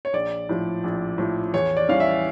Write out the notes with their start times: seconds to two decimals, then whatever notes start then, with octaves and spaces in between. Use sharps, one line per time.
0.05 C#5
0.13 A#1 D5
0.49 A2 F3
0.84 A#1
1.18 A2 F3
1.54 E2 C#5
1.77 D5
1.88 E3 G3 C#4 F5
2.00 E5